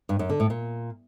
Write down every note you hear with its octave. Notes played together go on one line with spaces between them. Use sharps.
G2
F#2
D3
A2
A#2